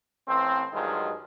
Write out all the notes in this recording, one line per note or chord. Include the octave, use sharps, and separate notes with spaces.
A1 E3 C4
G2 D#3 F3 F#3 G#3